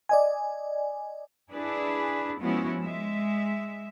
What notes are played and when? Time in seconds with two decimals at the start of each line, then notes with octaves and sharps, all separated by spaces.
0.09 D5 D#5 G#5
1.51 D4 E4 G#4 B4
2.39 F3 G#3 B3 C#4 E4 F#4
2.79 G#3 E5